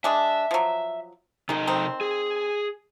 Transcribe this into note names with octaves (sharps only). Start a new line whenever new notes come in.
G#3 D4 E5
F3 F#3
C3 D#3 G#3 D#4 D#5
D#3 C4
G#4